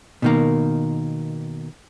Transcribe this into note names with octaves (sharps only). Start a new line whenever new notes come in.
B2 D#3 A#3